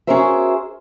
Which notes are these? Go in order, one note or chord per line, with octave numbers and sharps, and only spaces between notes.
C#4 F#4 G#4 A#4 C5 E5